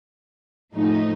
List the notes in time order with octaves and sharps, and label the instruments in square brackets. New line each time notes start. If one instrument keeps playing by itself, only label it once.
[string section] A2 F3 A3 D#4